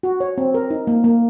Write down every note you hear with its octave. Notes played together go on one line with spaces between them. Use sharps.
F#4
C#5
C4
A#4
D#4
A#3
A#3